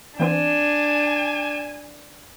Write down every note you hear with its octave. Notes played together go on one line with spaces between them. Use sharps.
E3 B3 C4 D4 G#5